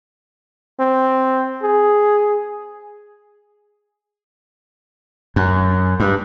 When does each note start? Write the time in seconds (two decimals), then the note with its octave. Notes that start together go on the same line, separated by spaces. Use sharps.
0.80 C4
1.63 G#4
5.36 F#2
6.00 G2